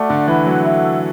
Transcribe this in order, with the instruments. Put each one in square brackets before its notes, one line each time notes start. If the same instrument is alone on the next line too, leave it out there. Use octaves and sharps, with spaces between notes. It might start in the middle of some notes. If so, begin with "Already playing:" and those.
Already playing: [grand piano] A3 [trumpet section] F#4 D5
[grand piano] D3
[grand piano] E3 [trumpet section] E4 B4 F#5
[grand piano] F#3
[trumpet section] F#4 A4 E5